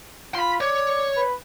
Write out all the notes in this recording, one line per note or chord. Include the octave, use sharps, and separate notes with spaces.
F4 B5 C6
C#5 D5
B4